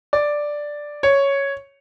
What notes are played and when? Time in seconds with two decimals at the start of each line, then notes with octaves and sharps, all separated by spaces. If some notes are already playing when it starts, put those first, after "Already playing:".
0.13 D5
1.03 C#5